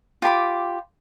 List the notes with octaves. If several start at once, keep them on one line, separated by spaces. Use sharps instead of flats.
F4 G4 B5 D6